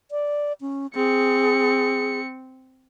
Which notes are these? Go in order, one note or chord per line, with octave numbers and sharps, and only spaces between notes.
D5
C#4
C4 G#4 C#7